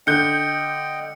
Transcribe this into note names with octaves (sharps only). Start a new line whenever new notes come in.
D3 D#5 G5 G6 C#7